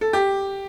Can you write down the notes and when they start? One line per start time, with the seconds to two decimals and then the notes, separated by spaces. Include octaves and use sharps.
0.01 A4
0.13 G4